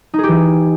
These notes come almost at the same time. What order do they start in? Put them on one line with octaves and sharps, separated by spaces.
D#4 G#4 G4 E3